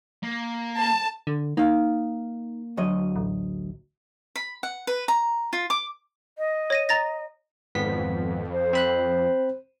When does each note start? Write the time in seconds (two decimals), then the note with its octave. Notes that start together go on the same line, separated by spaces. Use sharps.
0.23 A#3
0.76 A5
1.27 D3
1.57 A#3 D#4 F5
2.77 D2 F#3 D#5
3.16 A1
4.36 B5
4.63 F#5
4.87 B4
5.08 A#5
5.53 F4
5.70 D6
6.38 D#5
6.70 C#5 A#6 D#7
6.89 A#5 A6 A#6
7.75 G#1 F2 B3 B6
8.52 C5
8.73 C4 B5 F#6